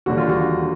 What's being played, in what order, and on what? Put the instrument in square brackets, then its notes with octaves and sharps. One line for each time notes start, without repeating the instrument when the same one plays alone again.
[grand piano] E1 D#2 D3 G3 F#4
F4
F#4